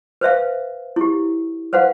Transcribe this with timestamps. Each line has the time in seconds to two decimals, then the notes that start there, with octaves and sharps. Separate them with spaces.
0.21 B4 C5 E5 F5
0.96 E4 G4
1.73 B4 C5 F5 F#5